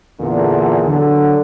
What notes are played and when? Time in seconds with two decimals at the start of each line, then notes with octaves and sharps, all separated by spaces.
0.20 E2 A#2 D3
0.86 D3 F#3